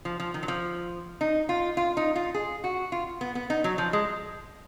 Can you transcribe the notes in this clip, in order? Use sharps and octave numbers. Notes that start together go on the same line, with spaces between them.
F3
F3
D#3
F#3
F3
D#4
F4
F4
D#4
F4
G#4
F#4
F4
B3
B3
D#4
F#3
F3
G#3